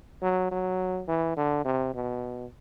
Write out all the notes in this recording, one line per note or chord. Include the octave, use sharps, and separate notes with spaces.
F#3
F#3
E3
D3
C3
B2